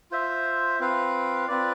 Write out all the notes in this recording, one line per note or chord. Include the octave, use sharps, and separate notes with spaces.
F4 C5 E5
C4 F4 B4 F5
C4 F4 B4 D5